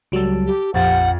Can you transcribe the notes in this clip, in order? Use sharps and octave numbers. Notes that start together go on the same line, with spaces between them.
C#2 F#3 G3 A4 D7
G4
A#1 F2 G4 F#5 A6